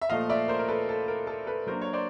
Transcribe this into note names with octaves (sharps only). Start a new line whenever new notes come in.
E5
A#2 F3 A3 D#5 F5
D5 E5
A#4 C5
A#4
A4 B4
A4
A#4
A4
A4 B4
F#3 A#3 D4 A#4 C5
C#5
C5 D5